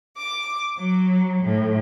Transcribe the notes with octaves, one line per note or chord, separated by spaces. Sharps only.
D6
F#3
A2